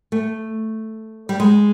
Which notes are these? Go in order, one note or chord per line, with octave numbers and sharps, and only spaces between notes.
A3
G3
G#3